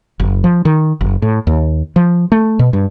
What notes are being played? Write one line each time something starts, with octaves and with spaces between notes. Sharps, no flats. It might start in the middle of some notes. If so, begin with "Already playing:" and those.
F#1
F3
D#3
F#1
A2
D#2
F3
A3
B2
G2